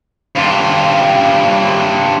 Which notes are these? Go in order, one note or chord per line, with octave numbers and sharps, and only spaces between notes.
G2 F4